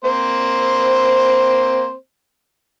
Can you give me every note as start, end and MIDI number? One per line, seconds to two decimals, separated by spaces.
0.05 1.93 58
0.05 1.93 60
0.05 1.93 72